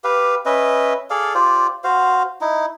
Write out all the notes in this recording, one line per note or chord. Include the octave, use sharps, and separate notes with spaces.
G4 B4 F5
C#4 B4 D#5 E5
G#4 A4 D5 F5
F4 G4 C5 D5
F#4 C5 F5
D#4 E4